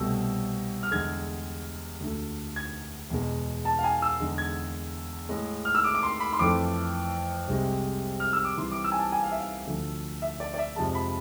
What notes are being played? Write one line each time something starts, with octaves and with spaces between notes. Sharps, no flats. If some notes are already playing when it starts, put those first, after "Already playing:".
Already playing: C2 B2 A3 E6
F6
E2 D3 G#3 G#6
D2 D3 A3
G#6
E2 B2 G#3
A5
F5
G#5
E6
E2 D3 G#3
G#6
A2 G#3
F6
E6
D6
D6
C6
B5
C6
F2 E3 A3 D6
C2 C3 G#3
F6
E6
D6
C2 C3 E3 C6
D6
E6
G#5
A5
G#5
F5
E5
F5
D2 D3 F3 A3
E5
D5
D5
E5
F2 C3 F3 G#3 A5
B5